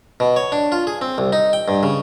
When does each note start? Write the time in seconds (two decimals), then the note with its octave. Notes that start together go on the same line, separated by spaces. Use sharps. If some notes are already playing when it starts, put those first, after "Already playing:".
0.20 B2
0.36 C#5
0.52 D4
0.72 F4
0.87 G#4
1.01 C4
1.18 C2
1.33 D#4
1.53 G5
1.68 G2
1.83 C#3